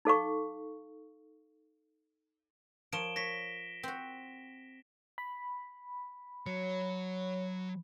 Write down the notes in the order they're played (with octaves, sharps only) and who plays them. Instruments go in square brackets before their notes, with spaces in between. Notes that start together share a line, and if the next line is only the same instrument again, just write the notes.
[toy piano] D#4 A4 F5 C#6
[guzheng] F3 A#4 C#5 [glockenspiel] D7 E7 G7
[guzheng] C#5 [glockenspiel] A#6 B6
[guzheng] C4 F#4
[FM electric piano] B5
[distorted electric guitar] F#3 [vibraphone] C#5